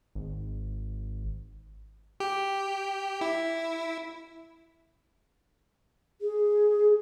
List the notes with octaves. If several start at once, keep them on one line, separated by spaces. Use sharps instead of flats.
G#1
G4
E4
G#4